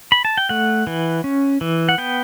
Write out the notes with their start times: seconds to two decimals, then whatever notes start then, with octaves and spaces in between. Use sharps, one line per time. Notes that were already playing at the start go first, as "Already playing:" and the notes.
0.12 B5
0.25 A5
0.37 G5
0.49 A3 F#5
0.87 E3
1.24 C#4
1.61 E3
1.89 F#5
1.98 B3 G5